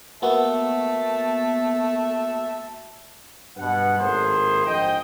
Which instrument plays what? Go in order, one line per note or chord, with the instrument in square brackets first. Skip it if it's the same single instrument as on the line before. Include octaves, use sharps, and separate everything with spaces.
[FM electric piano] A#3 B3 F#4 [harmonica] E5 A5
[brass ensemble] G2 B2 B4 F#5
G#1 A2 A#3 G#4 C5
A#1 G#2 C5 D#5 G5